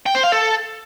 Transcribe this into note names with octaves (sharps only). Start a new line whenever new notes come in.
G5
C5
F5
A4